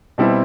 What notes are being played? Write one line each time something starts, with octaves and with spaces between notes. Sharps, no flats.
B2 G3 C4 E4